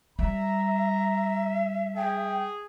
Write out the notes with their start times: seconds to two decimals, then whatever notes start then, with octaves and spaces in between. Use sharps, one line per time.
0.19 G3 E5 A#5
1.96 G#4 G5